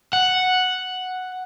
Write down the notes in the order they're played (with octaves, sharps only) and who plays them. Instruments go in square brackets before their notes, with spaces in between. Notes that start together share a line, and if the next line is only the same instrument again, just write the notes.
[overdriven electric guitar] F#5